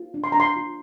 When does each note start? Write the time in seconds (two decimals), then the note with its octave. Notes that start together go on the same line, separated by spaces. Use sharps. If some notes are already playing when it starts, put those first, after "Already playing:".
Already playing: F4
0.14 D4
0.24 C6
0.32 D4 A#5
0.40 C6
0.56 F4